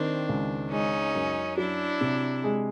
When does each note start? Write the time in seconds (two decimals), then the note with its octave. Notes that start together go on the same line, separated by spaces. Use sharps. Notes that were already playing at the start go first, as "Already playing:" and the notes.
Already playing: D#3 C4 D4
0.29 C#2
0.71 G#3 C#4 D#4
1.15 F#2
1.57 F#3 D4 E4
2.01 C3
2.44 G#3